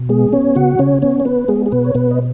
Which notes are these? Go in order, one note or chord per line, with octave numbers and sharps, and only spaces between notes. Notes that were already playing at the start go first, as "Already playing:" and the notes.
Already playing: B2
G#3 B3 G#4
B3 C#4 C#5
C#3 F#4 F#5
C#3 C#4 C#5
B3 C#4 C#5
C#5
B3 B4
G#3 B3 G#4
G#4
B2 B3 B4
C#5
B2 B3 B4
D#5